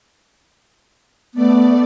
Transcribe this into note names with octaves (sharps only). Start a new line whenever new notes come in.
A3 B3 D5